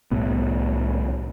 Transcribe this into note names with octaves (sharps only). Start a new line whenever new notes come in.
C2 A2 B3